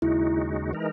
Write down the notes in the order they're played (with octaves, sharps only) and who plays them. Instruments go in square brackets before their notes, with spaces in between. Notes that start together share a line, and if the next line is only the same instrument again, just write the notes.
[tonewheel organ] D#2 C#3 G#3 D#4 F#4 [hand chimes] E4
[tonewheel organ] E3 G#3 D#4 A#4